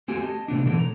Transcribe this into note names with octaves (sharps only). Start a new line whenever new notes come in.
A3 C4 F#4 G4 G#5
D#5 A5
A2 C3 B3 D4
B2 D3 E3 A3
A#5